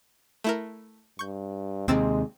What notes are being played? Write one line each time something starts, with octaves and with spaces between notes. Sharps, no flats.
A3 E4 A#4
G2 C#6 G6
D#2 C3 G#3 C4 E6 A6